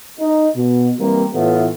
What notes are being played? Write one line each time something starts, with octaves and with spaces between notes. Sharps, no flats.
D#4
B2
E3 G3 A#3 C4
A2 E3 A3 B3 F4